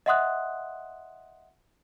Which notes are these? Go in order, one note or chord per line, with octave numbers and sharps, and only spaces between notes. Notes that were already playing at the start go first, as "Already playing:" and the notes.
D#5 E5 F#5 C6 D#6 F#6